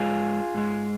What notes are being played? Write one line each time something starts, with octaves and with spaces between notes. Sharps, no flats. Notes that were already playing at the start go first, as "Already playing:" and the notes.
Already playing: G#2 G#3 F4 G#4
G#2 G#3